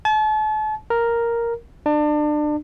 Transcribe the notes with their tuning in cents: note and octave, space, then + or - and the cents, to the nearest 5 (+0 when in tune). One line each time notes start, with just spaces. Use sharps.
A5 -40
A#4 +0
D4 +30